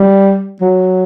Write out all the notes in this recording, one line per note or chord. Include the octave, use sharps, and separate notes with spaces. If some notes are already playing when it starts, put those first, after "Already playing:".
Already playing: G3
F#3